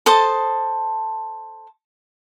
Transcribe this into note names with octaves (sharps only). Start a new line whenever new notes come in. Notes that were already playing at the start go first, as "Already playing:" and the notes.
A4 C5 A5 D#6